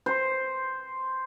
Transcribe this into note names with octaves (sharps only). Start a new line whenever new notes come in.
C5